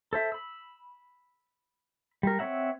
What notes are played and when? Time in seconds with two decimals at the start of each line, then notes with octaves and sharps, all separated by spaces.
0.13 A4 C5 E5
0.32 B5 E6
2.23 G3 A#4
2.39 C4 C#5 E5 F#5